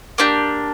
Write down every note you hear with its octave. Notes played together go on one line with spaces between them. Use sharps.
A#3 D4 G4